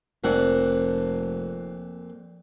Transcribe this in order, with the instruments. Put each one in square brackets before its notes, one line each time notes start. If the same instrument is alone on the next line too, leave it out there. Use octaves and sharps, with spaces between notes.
[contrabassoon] F1 [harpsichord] F2 A#2 F#5